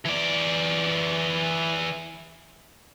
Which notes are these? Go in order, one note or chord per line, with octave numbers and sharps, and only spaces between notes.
E3 D5